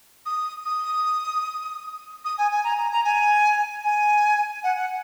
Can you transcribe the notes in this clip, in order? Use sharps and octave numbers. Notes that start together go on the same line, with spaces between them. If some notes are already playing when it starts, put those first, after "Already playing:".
D#6
D#6
D#6
G#5
G#5
A#5
A#5
A#5
G#5
G#5
F#5
F#5